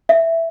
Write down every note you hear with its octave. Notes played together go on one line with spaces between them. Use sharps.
E5